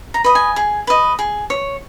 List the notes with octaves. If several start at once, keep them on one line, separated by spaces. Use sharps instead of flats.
A#5
B4 D#5
G#5
G#4
B4 D#5
G#4
C#5